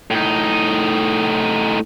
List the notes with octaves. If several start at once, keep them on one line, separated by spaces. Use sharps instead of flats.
A2 D#4